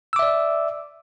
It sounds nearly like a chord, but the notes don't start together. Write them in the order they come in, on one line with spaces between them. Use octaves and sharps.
E6 D6 E5 D5